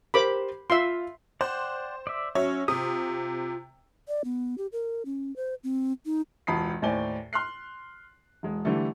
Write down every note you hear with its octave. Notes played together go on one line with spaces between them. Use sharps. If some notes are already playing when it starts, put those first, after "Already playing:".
G4 A#4 C5 B5 D6
F4 E5 C6
C5 D5 F#5 G5
D5 E5
F#3 C#4 C#5 E5
C3 F4 D#6
D5
B3
G4
A#4
C#4
C5
C4
D#4
E1 C#2 A5 B5 D#6 C7
D#2 A2 C5 D5 G#5 G7
C6 F6 F#6 C7
E1 G#3
D3 E3 G3 A3